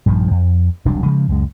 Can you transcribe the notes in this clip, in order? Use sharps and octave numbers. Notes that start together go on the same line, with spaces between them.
A#1 G2 D#3 F3
F2
E1 C2 F#3 D4
C#3 F3 G#3
C#2 F#2 G#3